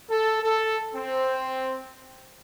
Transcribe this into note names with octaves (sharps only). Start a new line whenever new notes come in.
A4
A4
C4